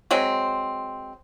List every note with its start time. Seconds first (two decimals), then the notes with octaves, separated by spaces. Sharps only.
0.11 F#3 G#3 C4